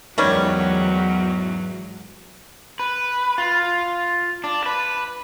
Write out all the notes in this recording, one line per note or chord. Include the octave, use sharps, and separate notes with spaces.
E2 G#2 D#3 F#3 G3 C#4
B4
F4
D4
B4